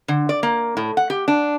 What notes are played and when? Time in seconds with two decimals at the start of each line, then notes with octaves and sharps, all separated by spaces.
0.08 D3
0.29 D5
0.43 A#3
0.77 A2
0.97 F#5
1.10 G4
1.28 D4